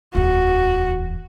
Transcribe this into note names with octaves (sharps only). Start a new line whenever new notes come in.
D1 E2 F#4